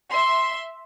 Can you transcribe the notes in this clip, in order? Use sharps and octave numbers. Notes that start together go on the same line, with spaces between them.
E5 C6